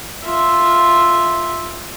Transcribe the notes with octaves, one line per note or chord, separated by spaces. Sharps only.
F4 E5